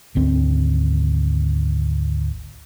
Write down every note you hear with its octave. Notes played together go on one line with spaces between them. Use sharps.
G#1 D2 C4